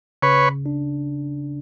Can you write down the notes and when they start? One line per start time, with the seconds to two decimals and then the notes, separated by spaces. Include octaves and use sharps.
0.22 C#3 B4 C#5
0.66 D4